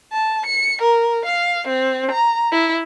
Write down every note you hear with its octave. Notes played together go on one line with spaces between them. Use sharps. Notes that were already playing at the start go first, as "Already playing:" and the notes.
A5
C#7
A#4
F5
C4
A#5
E4